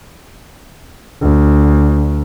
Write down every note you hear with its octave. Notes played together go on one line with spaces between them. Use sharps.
D2